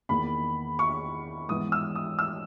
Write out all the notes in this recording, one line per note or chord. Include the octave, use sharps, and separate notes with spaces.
E2 D#3 A#3 B5
C#6
G#2 E3 B3 D#6
E6
D#6
E6